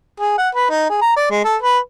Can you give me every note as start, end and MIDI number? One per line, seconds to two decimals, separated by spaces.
0.20 0.33 68
0.38 0.49 78
0.55 0.68 71
0.70 0.89 63
0.90 1.02 68
1.02 1.12 82
1.16 1.28 74
1.31 1.40 56
1.44 1.56 69
1.62 1.79 71